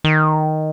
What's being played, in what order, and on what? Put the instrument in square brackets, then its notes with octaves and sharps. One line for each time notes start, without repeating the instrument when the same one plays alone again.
[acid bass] D#3